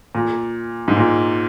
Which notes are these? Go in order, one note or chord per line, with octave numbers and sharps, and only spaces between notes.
A#2
G#2
A#2